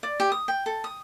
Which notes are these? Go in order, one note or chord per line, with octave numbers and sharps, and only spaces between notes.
D5
G4
D#6
G5
A4
D#6